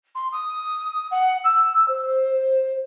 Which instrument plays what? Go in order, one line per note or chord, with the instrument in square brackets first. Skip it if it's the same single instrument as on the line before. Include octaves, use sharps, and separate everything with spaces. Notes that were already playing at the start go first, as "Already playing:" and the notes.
[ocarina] C6
D#6
F#5
E6
C5